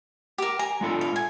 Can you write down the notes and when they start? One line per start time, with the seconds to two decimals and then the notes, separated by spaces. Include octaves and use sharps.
0.38 G4 A#4
0.59 G#5 A#5
0.81 G#3 F4 A4
1.01 F5
1.16 G#5